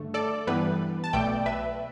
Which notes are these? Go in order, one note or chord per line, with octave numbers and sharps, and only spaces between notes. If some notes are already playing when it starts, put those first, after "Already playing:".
Already playing: G2 D3 A3
A4 D5
G2 E3 G3 B3 B4
A5
B1 B2 A3 D5 G5
B4 E5